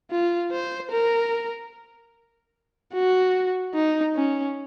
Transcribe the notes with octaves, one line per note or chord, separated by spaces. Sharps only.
F4
C5
A#4
F#4
D#4
C#4